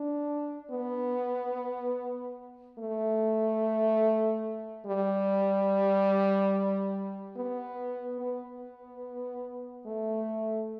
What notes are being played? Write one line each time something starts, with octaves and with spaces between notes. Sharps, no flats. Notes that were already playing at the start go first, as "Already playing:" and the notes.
Already playing: D4
B3
A3
G3
B3
B3
A3